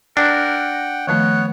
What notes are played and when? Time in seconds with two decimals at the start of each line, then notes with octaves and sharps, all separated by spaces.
0.17 D4 A#4 F#5 G5 A5
1.07 D#3 F3 A3 B3 C#5 F#5